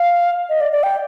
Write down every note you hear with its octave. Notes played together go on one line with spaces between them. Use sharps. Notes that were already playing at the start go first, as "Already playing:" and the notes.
Already playing: F5
D#5
D5
D5
G5